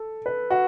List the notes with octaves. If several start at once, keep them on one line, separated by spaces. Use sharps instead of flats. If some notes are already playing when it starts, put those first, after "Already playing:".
Already playing: A4
B4
F#4